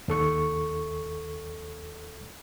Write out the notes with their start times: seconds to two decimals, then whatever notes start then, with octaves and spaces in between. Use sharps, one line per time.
0.08 D#2 A4 C#6